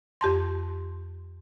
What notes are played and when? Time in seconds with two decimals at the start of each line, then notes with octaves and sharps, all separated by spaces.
0.21 F2 G4 A5 C6